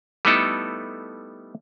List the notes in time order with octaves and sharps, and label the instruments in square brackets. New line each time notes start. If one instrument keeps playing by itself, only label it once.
[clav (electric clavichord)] G3 A3 B3 D#4 E4 A4